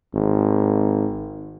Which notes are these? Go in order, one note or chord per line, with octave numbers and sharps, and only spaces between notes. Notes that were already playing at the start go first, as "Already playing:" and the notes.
G#1